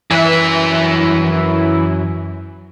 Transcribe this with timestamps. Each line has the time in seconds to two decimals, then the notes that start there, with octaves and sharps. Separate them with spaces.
0.11 F#2 E3 E5